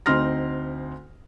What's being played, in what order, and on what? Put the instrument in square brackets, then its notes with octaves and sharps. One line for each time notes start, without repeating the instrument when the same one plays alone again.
[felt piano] D2 C4 D#4 C6 F6 A#6